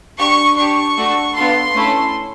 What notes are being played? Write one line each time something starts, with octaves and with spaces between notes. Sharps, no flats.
D4 G4 C#6
D4 G4 C#6
A3 D4 F#4 A4
B3 D4 F4 A4 C6
A3 C#4 E4 A4